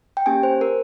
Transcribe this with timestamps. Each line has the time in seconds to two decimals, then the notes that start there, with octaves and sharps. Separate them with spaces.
0.17 G5
0.26 A#3 C#4 G4 G#5
0.43 C5
0.61 A#4